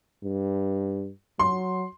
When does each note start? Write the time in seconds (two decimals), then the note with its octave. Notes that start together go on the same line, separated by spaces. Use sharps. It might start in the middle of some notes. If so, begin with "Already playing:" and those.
0.24 G2
1.39 F#3 C6